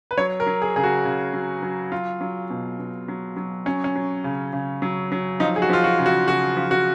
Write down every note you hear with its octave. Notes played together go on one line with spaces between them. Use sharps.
B4
F#3 C#5
A#4
F#3
G#4
C#3 G#4
F#4
C#3
F#3
F#3
F#3 F4
F#3
B2
B2
F#3
F#3
F#3 C#4
C#4
F#3
C#3
C#3
F#3
F#3
F3 D#4
G#4
F#4
F3 F4
F#4
C#3
F#4
C#3 F#4
F3
F#4